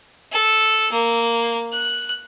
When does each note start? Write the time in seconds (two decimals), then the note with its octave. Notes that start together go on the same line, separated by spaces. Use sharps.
0.32 A4
0.92 A#3
1.73 F#6